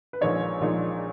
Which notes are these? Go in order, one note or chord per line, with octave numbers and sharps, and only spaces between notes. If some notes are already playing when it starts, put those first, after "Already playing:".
B4
A#1 A#2 F3 G#3 D#4 C#5
A#1 A#2 F3 G#3 D#4